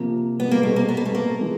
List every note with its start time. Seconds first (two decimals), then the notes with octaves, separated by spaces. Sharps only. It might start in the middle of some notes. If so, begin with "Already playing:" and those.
Already playing: C3 F3 A#3
0.40 B3
0.51 A#3
0.63 B2 G3 A3 C4
0.76 A#3
0.89 B3
0.97 A#3
1.05 A3
1.15 A#3
1.41 E3 G#3